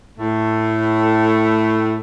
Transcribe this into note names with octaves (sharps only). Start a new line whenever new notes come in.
A2 A3